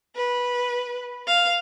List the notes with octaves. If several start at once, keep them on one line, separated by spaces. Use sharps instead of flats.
B4
F5